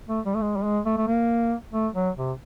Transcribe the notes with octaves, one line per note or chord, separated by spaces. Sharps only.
A3
G3
A3
G#3
G3
G#3
A3
A3
A#3
A3
F#3
C3